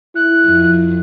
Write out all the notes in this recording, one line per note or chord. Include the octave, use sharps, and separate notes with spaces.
E4 F#6
F2